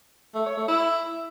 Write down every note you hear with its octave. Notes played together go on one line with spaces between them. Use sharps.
A3
C#5
A3
E4